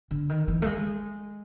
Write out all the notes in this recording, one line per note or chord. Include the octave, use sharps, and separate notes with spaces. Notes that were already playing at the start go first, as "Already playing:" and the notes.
D3
D#3
E3
A3
G#3